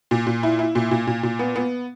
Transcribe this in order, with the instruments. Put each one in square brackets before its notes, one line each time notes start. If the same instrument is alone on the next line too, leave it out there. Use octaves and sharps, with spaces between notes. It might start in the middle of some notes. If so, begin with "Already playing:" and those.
[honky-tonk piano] A#2
A#2
E4
E4
A#2
A#2
A#2
A#2
B3
B3